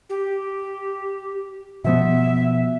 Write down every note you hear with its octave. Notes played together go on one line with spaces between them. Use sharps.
G4
B2 F3 B3 E5